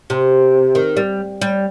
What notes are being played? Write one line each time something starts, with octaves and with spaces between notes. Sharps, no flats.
C3
D#3
G3
G3